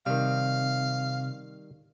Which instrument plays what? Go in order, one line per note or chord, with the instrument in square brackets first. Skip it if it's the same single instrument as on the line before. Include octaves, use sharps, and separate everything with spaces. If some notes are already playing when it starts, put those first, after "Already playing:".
[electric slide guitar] C3 [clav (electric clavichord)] D#3 G3 [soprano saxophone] F5